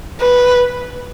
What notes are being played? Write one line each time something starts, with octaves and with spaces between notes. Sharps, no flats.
B4